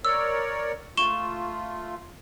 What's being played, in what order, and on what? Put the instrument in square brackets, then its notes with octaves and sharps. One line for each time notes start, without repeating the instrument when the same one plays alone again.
[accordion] A#4 C#5 D5 [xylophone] E6
[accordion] A3 F4 [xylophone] C#6 E7 G7